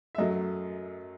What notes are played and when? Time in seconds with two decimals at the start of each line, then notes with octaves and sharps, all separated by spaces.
0.15 E5
0.18 F#2 F#3 A3 D#5